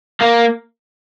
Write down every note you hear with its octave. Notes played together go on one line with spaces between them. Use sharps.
A#3